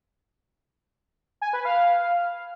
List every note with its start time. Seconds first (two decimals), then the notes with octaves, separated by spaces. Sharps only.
1.42 G#5
1.53 B4
1.65 F5